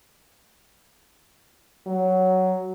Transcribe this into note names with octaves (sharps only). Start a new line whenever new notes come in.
F#3